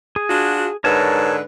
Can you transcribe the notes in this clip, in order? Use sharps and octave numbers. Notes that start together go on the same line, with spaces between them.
G#4
D4 F4 F#4
G#2 D3 A#4 B4 C#5 A5